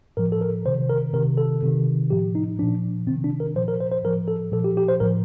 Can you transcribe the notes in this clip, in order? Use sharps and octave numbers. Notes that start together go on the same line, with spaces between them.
A2 F3 A#4
A4
A#4
C3 D#3 C5
A#4
C3 D#3 A#4
A4
C3 D#3
A2 F3 G4
D#4
A#2 F3 D4
C3 D#3 C4
D4
A#4
A#2 F3 C5
A#4
C5
C5
A2 F3 A#4
A4
A#2 F3 A4
G4
G4
C5
A2 F3 A#4